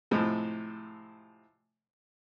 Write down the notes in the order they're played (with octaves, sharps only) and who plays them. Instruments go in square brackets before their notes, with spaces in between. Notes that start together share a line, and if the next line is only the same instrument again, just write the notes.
[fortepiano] A2 C3 F3 G#3